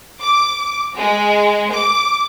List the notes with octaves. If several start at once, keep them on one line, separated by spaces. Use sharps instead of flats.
D6
G#3
D6